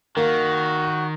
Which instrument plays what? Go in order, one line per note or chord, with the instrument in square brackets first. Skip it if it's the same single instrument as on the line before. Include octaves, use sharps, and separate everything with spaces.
[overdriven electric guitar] D#3 [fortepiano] A#3 [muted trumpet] F#4